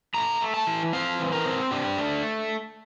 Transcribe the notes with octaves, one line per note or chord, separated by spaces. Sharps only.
A3 A#5
A3
A5
E3
C4 F5
E3
A#4
C4
D4 G4
A3